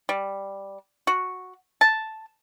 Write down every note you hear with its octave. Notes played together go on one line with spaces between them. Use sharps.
G3
F#4
A5